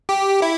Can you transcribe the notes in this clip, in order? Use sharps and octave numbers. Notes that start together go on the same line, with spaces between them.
G4
E4